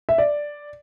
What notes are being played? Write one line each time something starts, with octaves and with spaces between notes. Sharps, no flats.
E5
D5